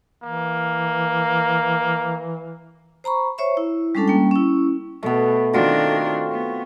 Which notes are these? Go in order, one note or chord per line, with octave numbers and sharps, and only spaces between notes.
E3 A#3
C5 A#5 B5 C#6
C5 C#5 E5 C#6
E4
G3 G#3 C#4 D4 A4 A5
G3 A#3 C#4 G5
C#4 E4
B2 A3 B3
D#3 C4 D4 F4 F#4
A4
B3